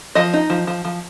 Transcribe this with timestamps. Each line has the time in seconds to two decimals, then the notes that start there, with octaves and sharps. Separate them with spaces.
0.15 F3 D#5
0.34 D#4
0.50 F3
0.67 F3
0.85 F3